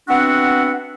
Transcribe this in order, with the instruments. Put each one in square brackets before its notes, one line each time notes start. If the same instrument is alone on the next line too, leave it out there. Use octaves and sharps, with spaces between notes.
[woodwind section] B3 C4 D4 F#4 E5 F#5